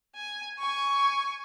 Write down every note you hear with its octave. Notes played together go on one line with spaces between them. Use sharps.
G#5
G#5 C#6